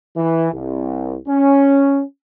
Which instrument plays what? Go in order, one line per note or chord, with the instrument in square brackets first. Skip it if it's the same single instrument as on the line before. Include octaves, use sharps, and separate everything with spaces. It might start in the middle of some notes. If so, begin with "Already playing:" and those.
[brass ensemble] E3
C2
C#4